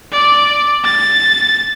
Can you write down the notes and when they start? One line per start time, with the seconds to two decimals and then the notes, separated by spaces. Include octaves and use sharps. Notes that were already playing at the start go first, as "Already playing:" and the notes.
0.12 D5
0.84 A6